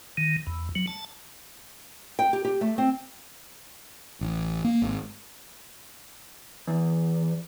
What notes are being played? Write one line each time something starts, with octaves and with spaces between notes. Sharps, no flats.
D#3
E2
F#3
A5
G5
G4
G4
A3
C4
A1
A#3
G#1
E2